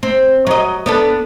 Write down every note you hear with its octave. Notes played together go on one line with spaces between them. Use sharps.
C4
F#3 D#5
B3 D4 A4